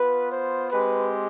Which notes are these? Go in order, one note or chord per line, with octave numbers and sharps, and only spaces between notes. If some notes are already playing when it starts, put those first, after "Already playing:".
Already playing: B3 F4 B4
C5
G#3 C4 G4 B4